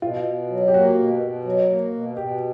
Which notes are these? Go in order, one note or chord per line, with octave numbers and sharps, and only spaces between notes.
B2 F4
B2
F#3
G4
A#3 F#4
B2
B2
F#3
A#3
B2
B2 G4